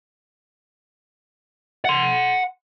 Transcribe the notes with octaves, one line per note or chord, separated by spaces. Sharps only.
F#5 C6